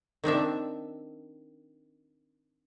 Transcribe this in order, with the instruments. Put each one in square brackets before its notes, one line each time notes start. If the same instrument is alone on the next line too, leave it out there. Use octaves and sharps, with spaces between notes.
[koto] D#3 C4 D4 E5